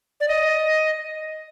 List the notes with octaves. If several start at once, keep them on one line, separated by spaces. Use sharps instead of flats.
D5
D#5